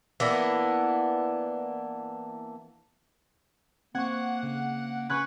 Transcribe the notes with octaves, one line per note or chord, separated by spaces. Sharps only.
E3 A#3 B3 D4
A#3 C4 F#5 C#6 G#6
C#3
C#4 B4 C#6 F#6 G#6